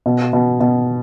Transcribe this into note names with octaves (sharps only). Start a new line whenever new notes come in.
B2
B2
B2